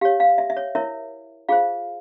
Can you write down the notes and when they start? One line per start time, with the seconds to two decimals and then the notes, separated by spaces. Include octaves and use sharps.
0.01 G4 C#5 F5
0.20 F5
0.38 E5
0.50 E5
0.57 C#5
0.75 E4 A#4 C#5 E5
1.49 F4 G#4 C5 F5